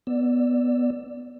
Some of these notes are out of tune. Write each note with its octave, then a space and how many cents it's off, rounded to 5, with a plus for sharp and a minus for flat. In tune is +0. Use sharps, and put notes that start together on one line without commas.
B3 +0 D5 +0 E6 +20